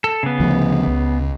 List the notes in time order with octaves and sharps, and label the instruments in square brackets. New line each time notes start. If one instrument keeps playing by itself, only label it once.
[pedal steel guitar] A4
C#3 B3
[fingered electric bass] D2 F3
C#2